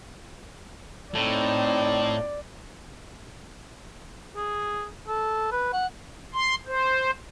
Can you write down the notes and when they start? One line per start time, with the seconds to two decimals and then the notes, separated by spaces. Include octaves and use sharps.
1.14 A2 C4 D#4 D5
4.36 G#4
5.08 A4
5.52 B4
5.73 F#5
6.34 C6
6.66 C5